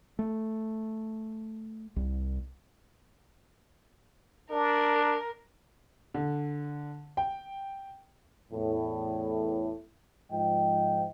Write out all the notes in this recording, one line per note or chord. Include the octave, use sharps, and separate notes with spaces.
A3
C2
D4 A#4
D3
G5
E2 A2
G#2 F3 D#5 G5